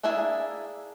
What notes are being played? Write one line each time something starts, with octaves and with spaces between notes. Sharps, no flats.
A#3 D4 E4 G#4 E5